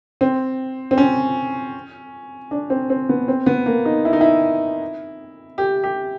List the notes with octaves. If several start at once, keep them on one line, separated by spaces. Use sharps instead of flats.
C4
C4
C#4
D4
C4
C4
B3
C4
B3
A#3
D#4
E4
D#4
E4
G4
G4